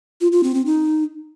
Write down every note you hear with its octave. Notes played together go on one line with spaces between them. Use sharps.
F4
F4
C4
C4
D#4